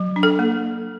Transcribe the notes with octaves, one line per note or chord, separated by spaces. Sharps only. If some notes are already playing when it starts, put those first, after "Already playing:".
Already playing: F#3
D4
A4
A#3